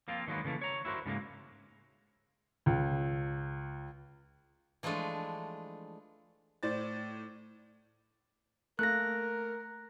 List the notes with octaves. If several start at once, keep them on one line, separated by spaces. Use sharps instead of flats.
F3 A#3 C4 F4
D#3 F#3 G#3 A#3 B3
C#3 E3 A3 A#3
C#5 A#5
E4 F#4 A#4 C5
G#2 C#3 G3 G#3 A#3
C#2
E3 F3 G#3 A3 D4
A2 C5 D5 A6
A3 A#3 A#4 F#6 A#6